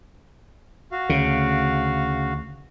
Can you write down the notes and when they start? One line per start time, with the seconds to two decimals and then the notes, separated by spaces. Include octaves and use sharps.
0.92 F#4 F5
1.09 D2 C#3